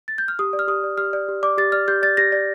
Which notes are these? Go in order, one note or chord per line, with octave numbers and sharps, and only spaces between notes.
A6
G6
F6
G4 D#6
D5
F6
G4 D#6
D5
G4 F6
D5
G4
D5 D6
G4 A6
D5 F6
G4 G6
D5 A6
G4 A#6
D5